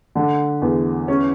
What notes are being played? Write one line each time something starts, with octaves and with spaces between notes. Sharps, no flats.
D3
E2
C#4